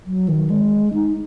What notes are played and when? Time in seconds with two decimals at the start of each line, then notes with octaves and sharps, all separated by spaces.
0.07 F#3
0.28 D#3
0.50 G#3
0.94 D#4